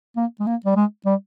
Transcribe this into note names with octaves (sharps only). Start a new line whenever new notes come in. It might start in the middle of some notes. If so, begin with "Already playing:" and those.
A#3
G#3
A#3
G3
G#3
G3